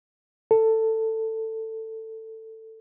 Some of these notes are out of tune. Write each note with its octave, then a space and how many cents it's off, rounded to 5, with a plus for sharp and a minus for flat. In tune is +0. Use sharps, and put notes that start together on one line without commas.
A4 +15